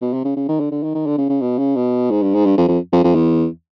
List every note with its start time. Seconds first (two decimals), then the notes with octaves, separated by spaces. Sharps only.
0.01 B2
0.14 C3
0.25 C#3
0.37 C#3
0.49 D#3
0.60 D3
0.71 D3
0.83 D#3
0.95 D#3
1.07 D3
1.18 C#3
1.29 C#3
1.41 B2
1.58 C#3
1.76 B2
2.11 G#2
2.23 G2
2.35 G#2
2.46 G2
2.58 F2
2.68 F2
2.93 F2
3.04 F2
3.15 E2